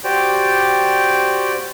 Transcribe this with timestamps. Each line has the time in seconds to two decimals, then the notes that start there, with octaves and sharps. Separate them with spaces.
0.04 F#4 G4 C5 D5 G5